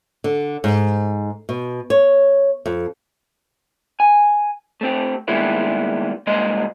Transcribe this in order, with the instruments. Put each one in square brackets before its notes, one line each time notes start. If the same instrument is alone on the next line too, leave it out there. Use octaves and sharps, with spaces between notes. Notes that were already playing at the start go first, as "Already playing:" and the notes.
[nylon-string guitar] D3
G#2
B2
C#5
F2
[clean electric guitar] G#5
A3 C4 G4
D#3 G3 G#3 A#3 B3 E4
C2 G2 G#3 A#3 D#5 C6